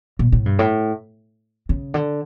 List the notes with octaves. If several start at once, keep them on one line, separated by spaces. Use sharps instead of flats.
A#2
A2
G2
A2
C#3
D3